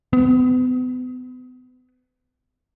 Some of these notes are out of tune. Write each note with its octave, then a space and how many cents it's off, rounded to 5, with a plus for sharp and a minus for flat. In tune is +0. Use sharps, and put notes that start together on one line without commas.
B3 +35